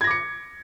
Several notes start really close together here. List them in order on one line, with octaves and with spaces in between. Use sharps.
G#6 A#6 D6 C#7